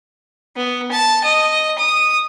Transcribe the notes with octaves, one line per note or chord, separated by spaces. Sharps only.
B3
A5
D#5
D#6